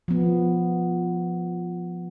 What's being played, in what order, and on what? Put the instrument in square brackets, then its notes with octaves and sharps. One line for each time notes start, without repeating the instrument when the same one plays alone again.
[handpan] F3 B3